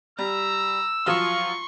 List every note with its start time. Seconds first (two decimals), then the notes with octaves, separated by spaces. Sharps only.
0.19 G3 A#5 E6
1.06 F3 F#3 F4 C6 C#6